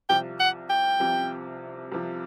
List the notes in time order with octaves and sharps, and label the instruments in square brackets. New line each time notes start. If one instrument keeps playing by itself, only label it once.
[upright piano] C2 C3 F3 [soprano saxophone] G5
[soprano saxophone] F#5
G5
[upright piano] C2 C3 F3
C2 C3 F3